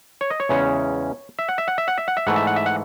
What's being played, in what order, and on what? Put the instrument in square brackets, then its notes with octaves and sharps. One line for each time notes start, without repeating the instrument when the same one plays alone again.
[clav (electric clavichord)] C#5
D#5
C#5
E2 C#3 G#3 C#4
E5
F#5
E5
F#5
E5
F#5
E5
F#5
E5
G#2 E3 A3 F#5
E5
F#5
E5
F#5